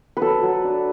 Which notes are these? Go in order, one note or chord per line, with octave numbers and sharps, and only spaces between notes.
F#3 A4 B4
F#3
D4